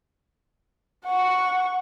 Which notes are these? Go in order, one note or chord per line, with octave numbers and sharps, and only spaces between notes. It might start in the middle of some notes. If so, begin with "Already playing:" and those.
F#5 C#6